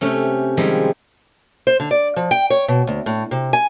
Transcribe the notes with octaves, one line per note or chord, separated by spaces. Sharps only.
C3 A3 C#4
D#3 F3 G3 G#3 E4
C5
D3
D5
F3
G5
C#5
B2
D2
A2
C3
G#5